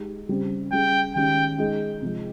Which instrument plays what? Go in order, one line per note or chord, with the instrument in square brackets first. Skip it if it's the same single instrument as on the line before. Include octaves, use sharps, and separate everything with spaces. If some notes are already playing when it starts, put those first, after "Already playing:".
Already playing: [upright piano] G#3 D#4 G4
C#3 G3 C4
[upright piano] G3 C#4 G#4 [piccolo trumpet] G5
[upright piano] D#3 G#3 C#4 G4 [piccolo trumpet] G5
[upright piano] G#3 D#4 G#4
C3 F3 G#3